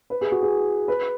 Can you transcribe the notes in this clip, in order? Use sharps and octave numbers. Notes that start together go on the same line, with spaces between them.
B4
G#4
F#4
G#4
B4